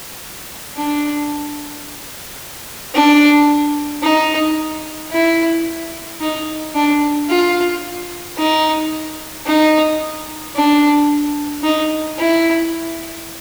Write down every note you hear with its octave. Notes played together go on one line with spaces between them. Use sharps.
D4
D4
D#4
E4
D#4
D4
F4
D#4
D#4
D4
D#4
E4